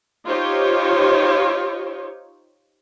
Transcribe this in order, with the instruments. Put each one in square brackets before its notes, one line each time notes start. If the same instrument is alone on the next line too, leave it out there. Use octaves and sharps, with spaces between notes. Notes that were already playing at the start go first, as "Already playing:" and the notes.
[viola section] D#4 F4 G4 C5 C#5